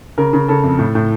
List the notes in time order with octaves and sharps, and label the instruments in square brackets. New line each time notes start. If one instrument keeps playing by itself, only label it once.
[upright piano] C#3 A#4
C#3
C#3 A4
F2
A2
A2